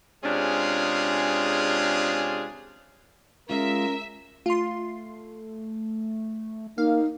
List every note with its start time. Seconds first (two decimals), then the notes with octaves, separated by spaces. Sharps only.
0.24 C3 G#3 C#4 D4 F4 G#4
3.50 G#3 C#4 F4 A#4 E5
4.46 A3 F4 C6
6.78 A#3 D#4 F5